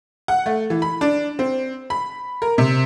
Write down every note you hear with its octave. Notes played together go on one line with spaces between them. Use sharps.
F#5
A3
E3
B5
D4
C4
B5
A#4
C3